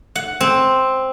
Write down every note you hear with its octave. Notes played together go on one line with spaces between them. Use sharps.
F#5
C4